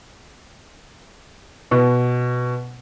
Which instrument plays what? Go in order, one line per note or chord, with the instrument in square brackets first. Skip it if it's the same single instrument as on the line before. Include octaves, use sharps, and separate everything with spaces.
[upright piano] B2